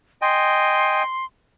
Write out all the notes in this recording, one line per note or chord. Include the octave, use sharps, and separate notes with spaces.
D#5 G5 G#5 C6